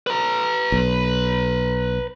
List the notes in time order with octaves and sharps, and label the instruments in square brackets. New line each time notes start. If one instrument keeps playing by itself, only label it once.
[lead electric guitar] B4 A#5
[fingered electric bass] B1